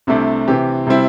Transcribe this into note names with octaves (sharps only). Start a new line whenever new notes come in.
C2 C3 A3 D4
C3 E3 C4 G4
C3 G3 C4 E4